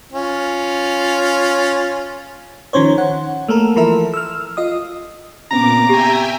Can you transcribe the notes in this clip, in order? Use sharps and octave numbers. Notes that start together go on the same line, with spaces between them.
C#4 F4
D#3 F3 C#4 C5 C#5
F#5
A3 A#3 A4 A#4
E3 F3 A4 A#4 E5
E6 F6
F4 D#5 D#6
A#2 C#3 B3 C4 A#5 D6
G4 E5 G5 G#5